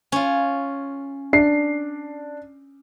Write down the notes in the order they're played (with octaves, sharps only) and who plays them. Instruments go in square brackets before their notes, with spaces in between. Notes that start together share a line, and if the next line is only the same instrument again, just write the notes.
[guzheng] C#4 F4
[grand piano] D4 C7